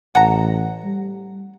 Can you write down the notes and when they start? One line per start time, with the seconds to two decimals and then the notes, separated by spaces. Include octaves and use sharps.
0.15 A1 F#5 A5 A#5
0.84 G3